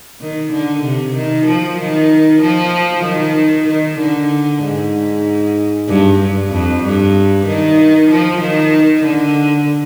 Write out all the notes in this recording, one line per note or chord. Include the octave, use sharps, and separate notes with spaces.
D#3
D3
C3
D#3
F3
D#3
F3
D#3
D#3
D3
G#2
G2
G2
F2
G2
D#3
F3
D#3
D3